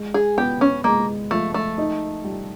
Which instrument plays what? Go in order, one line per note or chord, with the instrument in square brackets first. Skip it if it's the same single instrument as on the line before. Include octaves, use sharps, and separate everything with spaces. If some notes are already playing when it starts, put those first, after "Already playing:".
Already playing: [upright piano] G#3
[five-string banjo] G#4
[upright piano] B3 [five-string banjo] G4
[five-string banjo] C#4
[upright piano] G#3 [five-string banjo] A#3
[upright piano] F3 [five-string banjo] A3
[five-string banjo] A3
[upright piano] D#4
G3